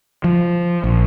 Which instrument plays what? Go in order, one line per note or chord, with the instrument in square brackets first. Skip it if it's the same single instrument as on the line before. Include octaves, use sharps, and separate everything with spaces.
[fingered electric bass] F3
A#1